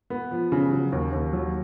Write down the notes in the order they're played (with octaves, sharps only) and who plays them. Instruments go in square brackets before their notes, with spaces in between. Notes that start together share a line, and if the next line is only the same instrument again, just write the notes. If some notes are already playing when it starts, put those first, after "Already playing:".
[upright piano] B3
F3
C#3
F#3
D#2
D#2
F#3